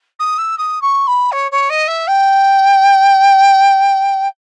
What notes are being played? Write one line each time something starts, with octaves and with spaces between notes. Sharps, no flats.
D#6
E6
D#6
C#6
B5
C#5
C#5
D#5
E5
G5